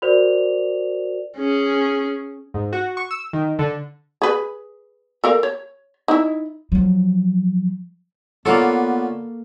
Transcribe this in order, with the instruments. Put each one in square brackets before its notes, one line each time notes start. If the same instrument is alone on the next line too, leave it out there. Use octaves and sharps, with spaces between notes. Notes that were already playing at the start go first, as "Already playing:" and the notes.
[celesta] F#4 A#4 C5 D5 F7
[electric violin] C#4 G#4
[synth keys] G#2
F#4
C#6
E6
D#3
D3
[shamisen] G#4 B4
A4 A#4 F5
C#5
D#4 E4
[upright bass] F3 F#3
[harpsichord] D3 C#4 F4 [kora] A#3 A4 [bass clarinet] B3